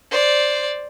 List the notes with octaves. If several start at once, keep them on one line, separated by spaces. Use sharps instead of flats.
C5 D5